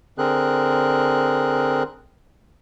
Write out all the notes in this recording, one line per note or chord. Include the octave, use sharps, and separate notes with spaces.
D3 C4 G#4 A#4 F#6